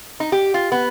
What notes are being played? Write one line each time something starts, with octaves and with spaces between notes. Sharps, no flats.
D#4
G4
F4
B3